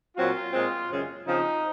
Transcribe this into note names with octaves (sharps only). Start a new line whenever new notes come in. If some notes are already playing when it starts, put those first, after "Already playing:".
A#2 F#3 C4 F4
A#2 G#3 C4
F#2 C#3 G#3
C#3 F3 C4 D#4